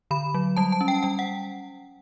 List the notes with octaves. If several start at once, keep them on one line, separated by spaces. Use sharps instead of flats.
D3 B5
F#3
G3 A5
A5
C#4
G5
G3 G5
F#5